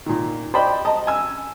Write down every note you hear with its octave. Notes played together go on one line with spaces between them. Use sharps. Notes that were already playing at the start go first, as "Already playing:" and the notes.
A#2 D#3
C5 D5 D#5 G5 B5
D#5 A5 A#5
G#5 E6